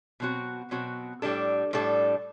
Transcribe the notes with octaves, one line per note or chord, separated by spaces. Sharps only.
B2 F#3 C4 F#4
B2 F#3 C4 F#4
A2 G3 D4 A4
A2 G3 D4 A4